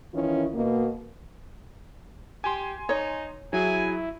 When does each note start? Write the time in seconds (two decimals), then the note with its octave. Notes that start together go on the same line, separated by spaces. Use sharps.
0.14 D#3 E3 C#4 E4 F4
0.54 B2 A#3
2.44 G4 G#5 C6
2.89 D#4 C#5
3.53 F#3 E4 G#4 G#5